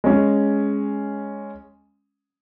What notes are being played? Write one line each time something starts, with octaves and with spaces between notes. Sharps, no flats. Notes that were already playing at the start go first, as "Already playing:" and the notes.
G#3 C#4